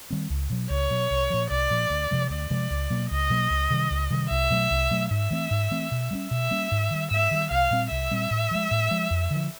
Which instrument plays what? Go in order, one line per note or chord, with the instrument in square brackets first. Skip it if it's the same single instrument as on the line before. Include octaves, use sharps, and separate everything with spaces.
[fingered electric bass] D#3 G3 C4
C#2
B2 F#3
[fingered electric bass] C#2 [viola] C#5
[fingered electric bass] B2 F#3
C2
A#2 F3
[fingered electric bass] C2 [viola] D5
[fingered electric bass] A#2 F3
D2
C3 F3 G#3
[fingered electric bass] D2 [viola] D5
[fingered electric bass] C3 F3 G#3
C#2
B2 F#3 A#3
[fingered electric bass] C#2 [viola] D#5
[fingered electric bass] B2 F#3 A#3
C#2
C3 D#3 G3
C#2
C3 D#3 G3
[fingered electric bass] C2 [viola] E5
[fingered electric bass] B2 F#3 A3
C2
B2 F#3 A3
[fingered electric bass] G#2 [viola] E5
[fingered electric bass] E3 A3 C4
G#2
E3 A3 C4
B2
G3 A#3 C#4
[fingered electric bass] B2 [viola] E5
[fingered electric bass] G3 A#3 C#4
G#2
D#3 G3
[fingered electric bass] G#2 [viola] E5
[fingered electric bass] D#3 G3
[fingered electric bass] C2 [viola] F5
[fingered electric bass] A#2 G3 C4
[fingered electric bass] C2 [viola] E5
[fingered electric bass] A#2 G3 C4
A2
F3 G#3
A2
F3 G#3
F2
D3 F3